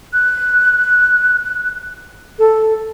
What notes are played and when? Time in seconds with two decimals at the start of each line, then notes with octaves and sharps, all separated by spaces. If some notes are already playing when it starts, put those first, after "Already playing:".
0.13 F#6
2.39 A4